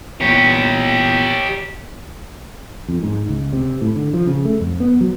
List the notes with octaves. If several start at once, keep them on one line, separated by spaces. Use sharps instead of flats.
E2 A#2 G4 C#5
F2
G#2
C#2
C3
A2
D3
F3
C#3
A3
F2
B3
F#3